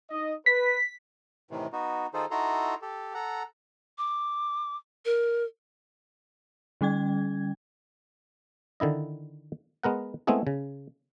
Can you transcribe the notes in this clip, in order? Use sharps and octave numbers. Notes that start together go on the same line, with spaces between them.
D#4 D#5
B4 B6
A2 C3 D#3 E3
B3 D#4 F#4
D#3 D#4 F4 G#4 A4 C5
D#4 E4 F#4 A4 A#5 C6
G4 A4
A4 F#5 A#5
D6
A#4
D3 G3 C#4 G5 G#6
D3 D#3 E4 D#5
G#3 B3 A#4 F#5
G#3 A3 B3 C4 E4 G#4
C#3